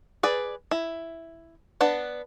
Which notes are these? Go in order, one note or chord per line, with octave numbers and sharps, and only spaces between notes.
G#4 B4 D5
E4
B3 D4 B4 F#5